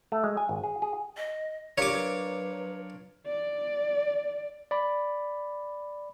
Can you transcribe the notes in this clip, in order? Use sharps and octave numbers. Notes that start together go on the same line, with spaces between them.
A3
G#3
G#5
G#1
G#4
G#4
D#5
D4 F4 G4 A#4 C#5 D6
F#3 B4
D5
D5 B5